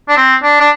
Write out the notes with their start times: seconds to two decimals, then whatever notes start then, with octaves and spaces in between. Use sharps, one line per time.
0.08 D4
0.17 C4
0.43 D4
0.60 D4